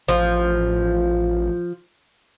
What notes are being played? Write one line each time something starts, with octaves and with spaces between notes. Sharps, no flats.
A1 F3